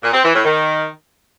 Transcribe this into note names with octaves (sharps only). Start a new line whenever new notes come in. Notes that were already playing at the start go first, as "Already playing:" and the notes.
A#2
C4
E3
A2
D#3